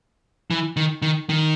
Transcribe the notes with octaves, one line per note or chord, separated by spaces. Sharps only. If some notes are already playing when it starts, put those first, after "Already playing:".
E3
D#3
D#3
D#3